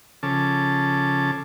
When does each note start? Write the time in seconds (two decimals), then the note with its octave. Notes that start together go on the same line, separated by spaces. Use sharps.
0.23 C#3 F3 C#4 A4 A5 D6